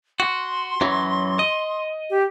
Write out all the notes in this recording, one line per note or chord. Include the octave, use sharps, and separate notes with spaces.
F#4 C6
F#2 E3 F#3
D#5
G4